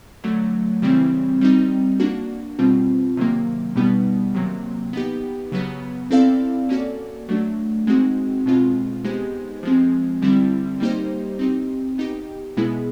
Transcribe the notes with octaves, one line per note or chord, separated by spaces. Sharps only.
D3 F#3 A3
C#3 E3 G3 C4 E4
G3 C4 D#4
A#3 D4 F#4
B2 G3 C4 F4
C3 D#3 F#3 A#3
B2 G3 B3 D#4
C3 D#3 F#3 A#3
B3 D#4 G4
C#3 F#3 B3
C4 E4 A4 D5 F5
A#3 C#4 F#4 A4 D5
F#3 A3 D4 F#4
G#3 C4 D#4 F#4
B2 G#3 C4 F4
G#3 B3 D#4 G4 C5
F3 G#3 C4
D3 G3 C4 E4
G3 A#3 D#4 G4 C5
C4 D#4 G4
B3 D#4 G4
B2 G#3 B3 E4 G#4